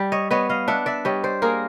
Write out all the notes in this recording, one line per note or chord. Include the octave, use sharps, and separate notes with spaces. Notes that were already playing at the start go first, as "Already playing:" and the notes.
Already playing: G3
C#5 D#5
B3 C#5 D#5
D#5 F5
D4 E5 F#5
D5 E5
G3 C#5 D#5
C5 D5
A#3 G#4 A#4